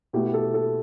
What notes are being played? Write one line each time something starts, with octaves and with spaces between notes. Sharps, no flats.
B2 A3 E4 G4
G4
A4
A4